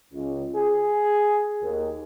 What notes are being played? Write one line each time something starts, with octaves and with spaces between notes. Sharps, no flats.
C#2
G#4
D#2